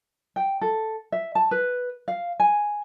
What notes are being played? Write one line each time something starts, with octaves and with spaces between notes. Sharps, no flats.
G5
A4
E5
A5
B4
F5
G#5